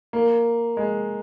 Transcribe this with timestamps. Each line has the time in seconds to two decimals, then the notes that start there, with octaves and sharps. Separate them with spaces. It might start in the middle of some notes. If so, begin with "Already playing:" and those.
0.13 A#3
0.77 G#3